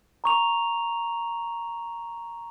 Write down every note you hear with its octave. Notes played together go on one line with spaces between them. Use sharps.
A#5 C#6 F7